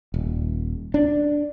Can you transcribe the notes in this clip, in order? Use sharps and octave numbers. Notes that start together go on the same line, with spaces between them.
D#1
D4